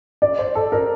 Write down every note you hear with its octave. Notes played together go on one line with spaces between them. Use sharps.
D5
C5
A4
A#4